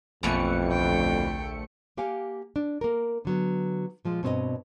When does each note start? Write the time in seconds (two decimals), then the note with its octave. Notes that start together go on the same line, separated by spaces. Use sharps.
0.23 A#1 F2 B2 E3 G3 A3 C#7
0.69 D2 G5
1.97 A#3 G4 F5 F#5 G#5
2.56 D4
2.81 A#3 A#4
3.25 D3 F#3 B3
4.05 A#2 F3 G#3
4.23 G2 B2 C4 D4 C#5 D#5